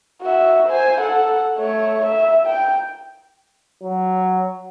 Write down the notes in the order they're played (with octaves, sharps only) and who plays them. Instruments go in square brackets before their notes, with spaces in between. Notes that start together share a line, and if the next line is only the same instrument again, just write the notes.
[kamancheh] F#4 E5
C5 G#5
A4 F#5
A3 C#5
E5
G5
[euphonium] F#3